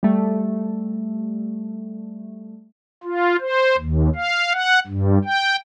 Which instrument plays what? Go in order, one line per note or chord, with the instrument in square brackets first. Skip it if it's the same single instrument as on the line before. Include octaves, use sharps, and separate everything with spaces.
[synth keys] G3 A3
[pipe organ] F4
C5
D#2
F5
F#5
G2
G5